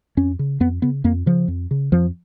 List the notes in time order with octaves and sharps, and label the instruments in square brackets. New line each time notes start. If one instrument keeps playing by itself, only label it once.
[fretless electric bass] F2 C#4
C#3
F2 B3
C#3 B3
F2 A#3
C#3 F3
F2
C#3
F2 F3